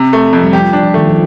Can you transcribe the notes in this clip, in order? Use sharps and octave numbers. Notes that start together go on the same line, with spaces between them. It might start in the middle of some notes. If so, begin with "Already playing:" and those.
Already playing: C3
A3
F2
G3
F3 G4
D4
F3
D#3 A3
F3